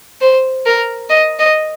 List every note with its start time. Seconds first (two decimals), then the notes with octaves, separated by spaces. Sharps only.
0.21 C5
0.65 A#4
1.09 D#5
1.39 D#5